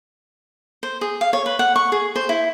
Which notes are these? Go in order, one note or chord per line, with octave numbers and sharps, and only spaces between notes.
C5
G#4
F5
C#5
B4
F#5
C#6
G#4
C5
E4